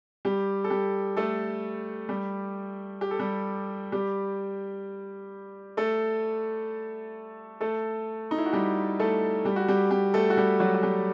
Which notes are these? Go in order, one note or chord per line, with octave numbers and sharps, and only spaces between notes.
G3 G4
A4
G3 G4
A3 A4
G3 G4
G4
A4
G3 G4
G3 G4
A3 A4
A3 A4
D#4
E4
F#4
G3 G4
A3 A4
G3 G4
F#4
G3 G4
G3 G4
A3 A4
F#4
G3 G4
F#3 F#4
F#4
G3 G4